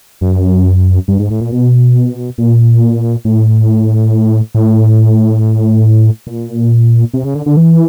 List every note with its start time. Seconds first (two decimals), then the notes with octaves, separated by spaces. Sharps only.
0.21 F#2
1.08 G2
1.19 G#2
1.30 A2
1.41 A#2
1.52 B2
2.38 A#2
3.25 A2
4.55 A2
6.27 A#2
7.14 C3
7.24 C#3
7.35 D3
7.46 D3
7.57 E3